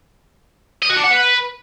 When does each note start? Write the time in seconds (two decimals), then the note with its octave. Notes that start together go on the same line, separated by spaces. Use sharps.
0.83 D#5
0.90 F#4
0.97 D4
1.04 F#5
1.11 B4